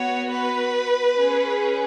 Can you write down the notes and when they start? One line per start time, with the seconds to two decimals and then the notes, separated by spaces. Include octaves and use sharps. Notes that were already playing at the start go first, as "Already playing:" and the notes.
Already playing: B3 F#4 C#5
0.29 B4
1.18 C#4 G#4